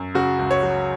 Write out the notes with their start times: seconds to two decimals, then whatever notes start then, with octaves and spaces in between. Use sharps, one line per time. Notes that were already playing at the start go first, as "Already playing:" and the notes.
Already playing: F#2
0.15 C#3 F#4
0.39 C#2
0.51 C#5
0.63 F#3